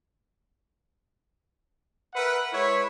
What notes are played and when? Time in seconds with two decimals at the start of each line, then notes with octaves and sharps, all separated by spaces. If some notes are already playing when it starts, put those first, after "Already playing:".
2.14 A#4 B4 E5 F#5
2.52 G#3 E4 B4 C#5